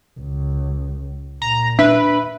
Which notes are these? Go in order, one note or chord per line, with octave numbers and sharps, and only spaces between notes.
C#2
A#2 A#5
D4 B4 E5